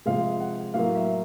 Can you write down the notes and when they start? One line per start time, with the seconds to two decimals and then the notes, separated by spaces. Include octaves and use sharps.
0.05 C3 F3 G#3 F5
0.40 F#5
0.74 A2 F#3 A#3 F5
0.95 E5